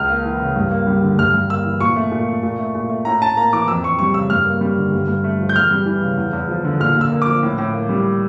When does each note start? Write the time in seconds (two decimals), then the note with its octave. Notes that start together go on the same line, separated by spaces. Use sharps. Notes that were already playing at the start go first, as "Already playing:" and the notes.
Already playing: C#2 F6
0.09 A#3
0.25 E3
0.40 C#3
0.56 G2
0.71 A#3
0.87 G3
1.03 D3
1.19 G2 F6
1.34 G2
1.50 A#3 E6
1.65 E3
1.80 A#2 C#6
1.96 A3
2.11 A#2
2.28 A3
2.43 A#2
2.59 A3
2.75 A#2
2.90 A3
3.05 A2 A#5
3.22 A2 A5
3.37 A#3 A#5
3.53 E3 D6
3.68 F2 E6
3.83 F2 C#6
3.99 G3 C#6
4.14 C#3 E6
4.30 G2 F6
4.46 A#3
4.61 G3
4.78 D3
4.92 G2
5.08 G2
5.24 A3
5.40 F3
5.49 G6
5.55 E2 F6
5.71 G3
5.86 E3
6.02 C#3
6.17 E2
6.33 E2
6.49 F3
6.65 D3
6.80 A#2 F6
6.95 A#2
7.01 E6
7.12 A#3
7.22 F3 D6
7.43 A2
7.58 A2
7.73 A#3
7.89 G3